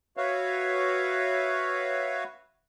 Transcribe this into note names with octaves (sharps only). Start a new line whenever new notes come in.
F#4 B4 C#5 E5 F5